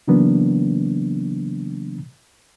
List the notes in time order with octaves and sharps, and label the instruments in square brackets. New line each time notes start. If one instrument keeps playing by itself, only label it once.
[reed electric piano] C#3 E3 F#3 A#3 B3 D4